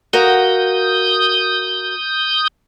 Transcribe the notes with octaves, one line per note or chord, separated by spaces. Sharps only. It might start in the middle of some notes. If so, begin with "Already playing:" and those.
F#4 A#4 F5 D#6 G6